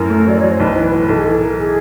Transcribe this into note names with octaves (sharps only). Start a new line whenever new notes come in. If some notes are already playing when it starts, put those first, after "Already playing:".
Already playing: F#2 A2 A#4
A3
F#3 D5
F#3 C#5
C5
B1 B4
C5
E3
B4
A2
B4
B1 A4
G#4
E3 A4
E3 A#4
G#4